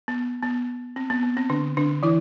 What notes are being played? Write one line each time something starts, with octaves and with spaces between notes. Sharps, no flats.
B3
B3
C4
B3
B3
C4
D3 D4
D3 D4
E3 E4